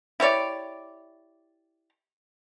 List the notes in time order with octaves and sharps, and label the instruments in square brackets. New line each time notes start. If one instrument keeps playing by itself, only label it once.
[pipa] E4 G4 C#5 D5